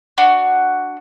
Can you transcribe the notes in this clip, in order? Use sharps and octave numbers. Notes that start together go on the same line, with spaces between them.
D4 F#4